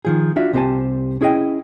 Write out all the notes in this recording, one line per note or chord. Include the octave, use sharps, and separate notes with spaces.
D#3 F3 G#4
D4 F4 F#4 E5
C2 C4 G4 C5 G#5 A5
C#4 E4 G#4 C#5 D#5 G5